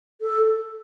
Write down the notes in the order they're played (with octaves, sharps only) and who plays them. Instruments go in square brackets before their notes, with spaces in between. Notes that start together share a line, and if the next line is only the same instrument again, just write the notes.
[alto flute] A4